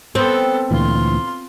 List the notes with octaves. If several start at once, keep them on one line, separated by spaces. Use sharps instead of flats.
B3 C4 A4
D2 A#2 E3 F4 C6